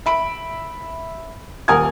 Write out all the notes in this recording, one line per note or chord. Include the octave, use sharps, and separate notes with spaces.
E5 B5 D7
D#1 A#4 F#5 G#5 D#6 G#6